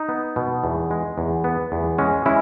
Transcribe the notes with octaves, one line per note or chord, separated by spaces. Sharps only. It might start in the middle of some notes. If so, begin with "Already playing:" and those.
Already playing: D#4
B3
B2
E2
G#3
E2
B3
E2
G#3 C#4
G#3 C#4 E4